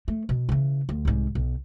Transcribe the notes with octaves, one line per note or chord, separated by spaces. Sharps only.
A3
B2
C#3 E3
D2
C2 G#2
B1